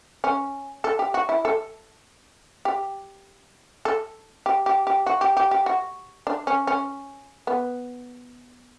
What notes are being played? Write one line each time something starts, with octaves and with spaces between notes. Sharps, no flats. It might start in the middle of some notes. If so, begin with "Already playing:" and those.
C#4
A4
G4
F#4
E4
A4
G4
A4
G4
G4
G4
F#4
G4
G4
G4
F#4
D4
C#4
C#4
B3